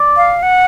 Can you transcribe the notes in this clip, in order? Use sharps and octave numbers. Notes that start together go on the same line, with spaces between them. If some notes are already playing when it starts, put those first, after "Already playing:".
Already playing: D5
F5
F#5